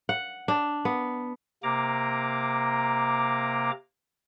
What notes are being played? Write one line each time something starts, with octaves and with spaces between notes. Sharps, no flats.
F#5
D4
B3
C3 A#3 A#5 D6